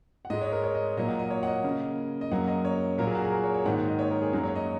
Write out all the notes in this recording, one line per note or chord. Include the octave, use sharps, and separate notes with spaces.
F#5
G#2 G#3 D#5
C#5
A#4
C#5
D#5
A#2 F#3 A#3 D#5
F#5
D#5
C#5
F#5
D#5
C#3 A#3
D#5
F#2 C#3 F#3 A#3 F#5
D#5
C#5
A#2 F#3 A#3 A#4
G#4
F#4
G#4
A#4
C#5
C#5
G#2 D#3 A#3 F#5
F#5
D#5
C#5
A#4
G#4
F#2 F#3 A#3
C#5
D#5